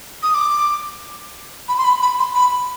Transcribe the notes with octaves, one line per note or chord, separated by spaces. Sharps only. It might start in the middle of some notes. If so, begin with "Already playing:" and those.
D#6
D6
B5
C6
B5
B5
C6
B5